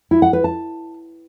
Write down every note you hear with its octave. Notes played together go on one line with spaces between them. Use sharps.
E4
F#5
B4
A5